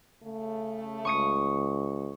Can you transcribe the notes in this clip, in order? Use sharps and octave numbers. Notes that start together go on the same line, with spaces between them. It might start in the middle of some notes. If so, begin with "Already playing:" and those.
C#3 A3
C#2 C#6 D#6 C#7